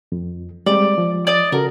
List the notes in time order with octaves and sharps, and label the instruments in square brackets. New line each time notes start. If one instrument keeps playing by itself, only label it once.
[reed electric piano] F2
[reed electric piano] G3 G#3 C4 [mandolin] D5
[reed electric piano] F3
[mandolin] D5 D#5
[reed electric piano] C#3 F#4 A4 [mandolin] A#4